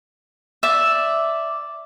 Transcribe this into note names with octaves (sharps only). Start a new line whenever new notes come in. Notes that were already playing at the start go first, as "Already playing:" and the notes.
D5 E5